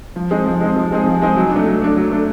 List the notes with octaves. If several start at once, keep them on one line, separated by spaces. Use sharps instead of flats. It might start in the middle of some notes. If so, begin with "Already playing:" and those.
F3
G#3 C4 D#4 G#4
F3
G#3 C4 D#4 G#4
F3
G#3 C4 D#4 G#4
F3
G#3 C4 D#4 G#4
F#3
D4
A3
F#3
A3 D4
F#3
A3 D4